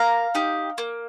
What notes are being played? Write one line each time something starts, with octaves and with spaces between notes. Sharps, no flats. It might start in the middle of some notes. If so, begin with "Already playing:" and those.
Already playing: A#3 F5 A#5
D#4 G4
A#3